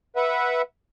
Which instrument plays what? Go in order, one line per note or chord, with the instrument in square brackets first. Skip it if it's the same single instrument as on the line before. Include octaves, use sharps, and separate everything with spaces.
[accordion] B4 E5 F#5